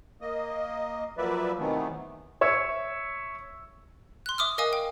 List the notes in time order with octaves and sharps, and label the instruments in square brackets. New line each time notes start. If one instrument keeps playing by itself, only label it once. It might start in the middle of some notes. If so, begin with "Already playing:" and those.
[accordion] A#3 D#5
F3 F#3 A#3 B4 D5 E5
C3 D#3 E3 F#3 A3 B3
[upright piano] C#5 E5 E6
[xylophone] C6 F#6
E5 D6 D#6 F6
A#4 D#5 F5 G#5 D#6
G5